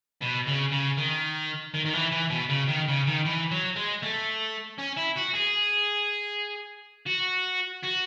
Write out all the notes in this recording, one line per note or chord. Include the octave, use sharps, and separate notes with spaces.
B2
C#3
C#3
D#3
D#3
D#3
E3
E3
B2
C#3
D#3
C#3
D#3
E3
F#3
G#3
A3
C#4
E4
F#4
G#4
F#4
F#4